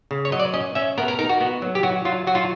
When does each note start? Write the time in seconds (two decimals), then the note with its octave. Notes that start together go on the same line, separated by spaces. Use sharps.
0.11 C#3
0.25 C#5
0.32 F#3 D#5
0.40 D5
0.54 C#4 D#5
0.75 C#4 E5
0.98 B3 A#4
1.08 A#4
1.19 D#4 A#4
1.29 F#4
1.41 B3
1.62 F#3
1.75 G4
1.83 F#3 F#4
2.05 F#3 F4
2.27 F#3 F#4
2.35 F4